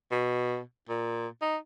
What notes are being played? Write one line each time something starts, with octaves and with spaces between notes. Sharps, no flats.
B2
A#2
D#4